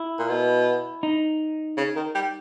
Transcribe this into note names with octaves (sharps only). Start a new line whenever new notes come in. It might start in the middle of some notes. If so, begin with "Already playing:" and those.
Already playing: E4
A#2
B2
D#4
C#3
D#3
G3